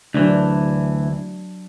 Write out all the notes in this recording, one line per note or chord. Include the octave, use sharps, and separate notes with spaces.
D2 E3 F#3 D4